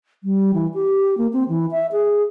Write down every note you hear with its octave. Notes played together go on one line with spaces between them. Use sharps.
G3
E3
G4
A#3
C4
E3
E5
G#4